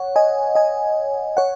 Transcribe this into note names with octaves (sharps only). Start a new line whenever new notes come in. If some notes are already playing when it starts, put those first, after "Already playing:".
Already playing: C#5 F#5
D#5 G#5
D#5 G#5
C#5 F#5